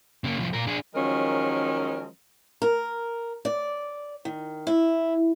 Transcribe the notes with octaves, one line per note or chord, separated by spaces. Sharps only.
C#3 A#3
C2 F3
A#2 A#4
D4 G#4
D#3 F3 F#3 G#3 C#4 A#4
A#4
D5
D#3
E4